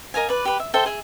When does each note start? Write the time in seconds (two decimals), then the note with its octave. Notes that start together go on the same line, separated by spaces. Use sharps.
0.14 A#4 D#5 F5 G#5
0.29 B4 D5
0.45 G4 B4
0.60 E5
0.74 A4 C5 E5 G5
0.86 G#4 E5